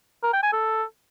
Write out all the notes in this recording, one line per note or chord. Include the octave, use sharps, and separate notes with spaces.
A#4
G5
G#5
A4